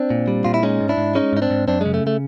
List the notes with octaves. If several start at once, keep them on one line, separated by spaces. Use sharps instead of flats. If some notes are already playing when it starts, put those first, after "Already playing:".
Already playing: C4 D4
A#2
G3
A#2 F4
E4
G#3 C#4 D#4
G#2
D4 E4
G#2
G#3 C#4 D#4
G#2 D#4
C4 D4
G#2
F#2 C4 D4
C#3 G#3
A3
A3